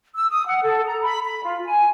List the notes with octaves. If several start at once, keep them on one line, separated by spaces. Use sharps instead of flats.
E6
D#6
F#5
A4
A#5
B5
B5
F4
G#5